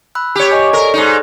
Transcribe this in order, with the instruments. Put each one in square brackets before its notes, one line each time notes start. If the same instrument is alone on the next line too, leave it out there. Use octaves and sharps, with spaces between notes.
[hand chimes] B5 E6 F#6
[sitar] G4 C#5
[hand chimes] D#5 G#5
[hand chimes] A4 D5 [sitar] A#4
[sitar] G#2 D#4